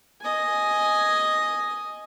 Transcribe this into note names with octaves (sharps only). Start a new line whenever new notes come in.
D#5 G#5